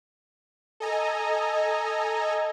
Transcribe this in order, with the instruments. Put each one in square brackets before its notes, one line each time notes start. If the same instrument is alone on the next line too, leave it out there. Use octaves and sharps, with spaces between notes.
[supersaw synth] A4 D#5 G#5 A#5